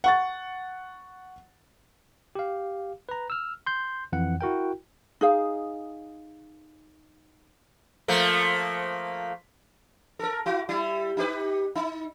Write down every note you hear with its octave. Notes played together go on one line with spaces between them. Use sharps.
F#5 C#6 A6
G4 F5
B4 A#5
E6 F6
C6 G6
F2 E3 F#5
E4 F#4 A#4 G5
D#4 G#4 F5
F3 A3 A#3
A4 A#4
E4 F#4
G3 E4
D#4 G4 B4
D#4